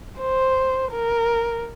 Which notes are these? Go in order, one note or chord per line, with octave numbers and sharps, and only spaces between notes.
C5
A#4